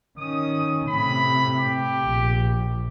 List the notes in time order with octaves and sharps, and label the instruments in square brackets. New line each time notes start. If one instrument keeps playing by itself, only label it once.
[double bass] D#3 C#4 [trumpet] D#6
[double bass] A2 C3 [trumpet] B5
[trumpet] G4
[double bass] A#1